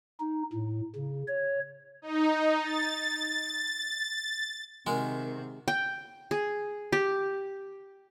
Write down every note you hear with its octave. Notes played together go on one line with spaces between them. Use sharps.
D#4
A2
C#3
C#5
D#4
A6
C3 D#3 G#3 F#4 A#4 C5
G5
G#4
G4